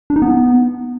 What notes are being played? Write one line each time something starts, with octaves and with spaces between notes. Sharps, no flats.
D4
D#4
B3